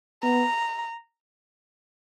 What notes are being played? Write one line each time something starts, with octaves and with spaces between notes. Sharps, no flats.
B3 A#5